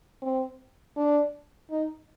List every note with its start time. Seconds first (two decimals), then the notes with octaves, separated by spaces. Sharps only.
0.22 C4
0.96 D4
1.70 D#4